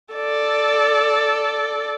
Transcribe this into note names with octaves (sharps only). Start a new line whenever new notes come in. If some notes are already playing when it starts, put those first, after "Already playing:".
A4 D5